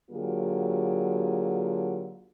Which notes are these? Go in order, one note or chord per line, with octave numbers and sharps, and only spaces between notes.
D3 F#3 A#3 F4 G4 G#4